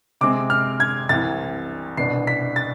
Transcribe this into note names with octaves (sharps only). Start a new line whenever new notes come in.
C3 G#3 C4 D6
F6
G#6
C2 C3 E3 A6
C2 B2 B3 D4 C7
B6
A6